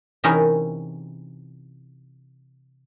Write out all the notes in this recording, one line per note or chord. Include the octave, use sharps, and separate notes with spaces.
C3 E3 C#4 D#4 G#4 A#4